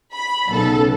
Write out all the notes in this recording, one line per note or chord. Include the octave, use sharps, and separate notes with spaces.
B5
B1 C#3 B3 A4